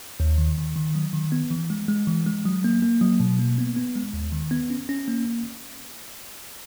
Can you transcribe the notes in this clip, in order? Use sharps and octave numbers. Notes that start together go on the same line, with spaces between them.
D#2
D#3
D#3
D#3
F#3
D#3
B3
E3
G#3
G#3
E3
G#3
F#3
A#3
A#3
F#3
B2
A#3
B3
B3
G#3
D#2
D#3
B3
C#4
C#4
A#3